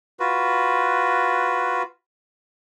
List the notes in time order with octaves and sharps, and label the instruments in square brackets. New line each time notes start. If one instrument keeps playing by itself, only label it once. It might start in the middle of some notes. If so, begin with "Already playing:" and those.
[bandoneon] F4 F#4 B4